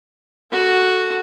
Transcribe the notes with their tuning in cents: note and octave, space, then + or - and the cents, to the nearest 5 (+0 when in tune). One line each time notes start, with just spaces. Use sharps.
F#4 +0 A4 +0